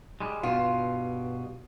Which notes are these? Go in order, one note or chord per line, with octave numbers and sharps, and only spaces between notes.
G3 G#3
G2 B2 F4